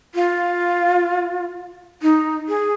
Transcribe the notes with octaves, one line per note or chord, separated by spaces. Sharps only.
F4
D#4
G#4